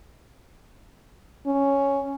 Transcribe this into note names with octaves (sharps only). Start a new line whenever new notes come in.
C#4